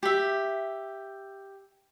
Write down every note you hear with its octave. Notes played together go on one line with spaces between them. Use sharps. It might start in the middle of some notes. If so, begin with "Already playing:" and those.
G4 E5